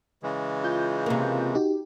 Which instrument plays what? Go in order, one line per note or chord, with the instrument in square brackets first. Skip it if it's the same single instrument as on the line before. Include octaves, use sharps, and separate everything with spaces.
[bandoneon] C#3 E3 G#3
[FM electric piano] F4 G6
[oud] C3 A#3
[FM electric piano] D#4 F#4 G4